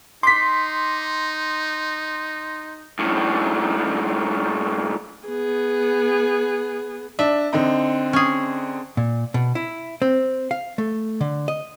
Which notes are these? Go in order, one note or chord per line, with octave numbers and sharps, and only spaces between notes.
D#4 C6 D6 B6
F#2 A2
B3 G#4
D4 E5
D3 C4 D#4
C#4 G#4
A#2
B2
E4
C4
F5
A3
D3
D#5